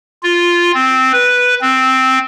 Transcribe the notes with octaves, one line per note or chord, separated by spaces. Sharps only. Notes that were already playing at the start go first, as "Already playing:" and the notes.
F4
C4
B4
C4